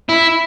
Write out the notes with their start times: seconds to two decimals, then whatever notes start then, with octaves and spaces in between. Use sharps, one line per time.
0.09 E4